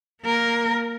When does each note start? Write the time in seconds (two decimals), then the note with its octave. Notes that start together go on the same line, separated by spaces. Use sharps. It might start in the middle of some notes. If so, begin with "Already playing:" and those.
0.22 A#3 A#4